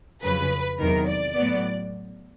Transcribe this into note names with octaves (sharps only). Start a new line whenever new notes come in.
F2 C#3 F#3 B4
E2 C3 D#3 F#3 A#4
D5
A2 F#3 B3